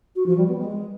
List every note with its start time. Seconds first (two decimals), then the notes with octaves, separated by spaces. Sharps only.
0.15 F#4
0.26 F3
0.36 G3
0.47 B3
0.58 G#3